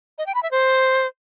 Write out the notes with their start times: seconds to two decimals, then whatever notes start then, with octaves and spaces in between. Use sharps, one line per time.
0.18 D#5
0.26 G5
0.35 B5
0.43 E5
0.51 C5